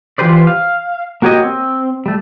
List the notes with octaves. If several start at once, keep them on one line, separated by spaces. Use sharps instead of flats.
E3 F4 G4 B4 C5 D5
F5
A#3 F#4 G4 C#5 D#5
C4
G3 A3